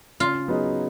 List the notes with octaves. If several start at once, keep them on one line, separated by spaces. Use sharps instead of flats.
C#3 F4
F#3 B3 D#4 G#4